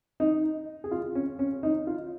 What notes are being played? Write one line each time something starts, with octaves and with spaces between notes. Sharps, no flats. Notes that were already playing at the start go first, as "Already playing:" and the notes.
D#4
G#4
F4
C#4
C#4
D#4
F4